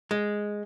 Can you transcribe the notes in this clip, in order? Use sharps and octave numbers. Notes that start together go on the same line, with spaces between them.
G#3